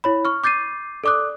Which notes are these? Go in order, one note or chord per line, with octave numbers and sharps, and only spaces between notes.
E4 C#5 B5
C#6 F6
D6 G6 A6 C7 D#7
A4 D5 D6 D#6 F#6